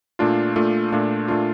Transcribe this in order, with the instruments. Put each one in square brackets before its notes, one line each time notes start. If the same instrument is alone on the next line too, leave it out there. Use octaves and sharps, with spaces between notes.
[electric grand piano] A#2 A3 D4 F4
A#2 A3 D4 F4
A#2 A3 D4 F4
A#2 A3 D4 F4